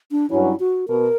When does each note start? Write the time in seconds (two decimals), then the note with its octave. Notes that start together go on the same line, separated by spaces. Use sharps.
0.11 D4
0.30 G2 F#3 C#4 E4
0.60 F#4
0.88 B2 A#4